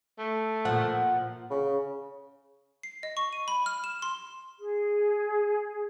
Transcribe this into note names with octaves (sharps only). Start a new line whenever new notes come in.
A3
A#2 F3 F#5
C#3
C7
D#5
C#6
D#7
B5
F6
E7
C6
G#4